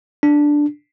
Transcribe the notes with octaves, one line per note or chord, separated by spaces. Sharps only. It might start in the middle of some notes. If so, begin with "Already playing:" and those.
D4